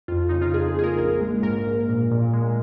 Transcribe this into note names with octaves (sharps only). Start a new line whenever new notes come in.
F2 F4
C#3 D#4
F4
F2 G#4
A#3 G#4
A#4
A#1 A#4
G#3
G#2 A#4
A#1
A#2
A#2
G#3